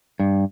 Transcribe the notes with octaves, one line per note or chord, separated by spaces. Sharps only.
G2